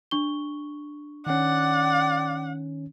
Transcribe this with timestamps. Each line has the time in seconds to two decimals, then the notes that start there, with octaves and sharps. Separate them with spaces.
0.11 D4 C#6 G7
1.27 D#3 C#4 D5 F#5